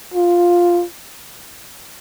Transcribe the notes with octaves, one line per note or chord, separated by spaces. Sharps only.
F4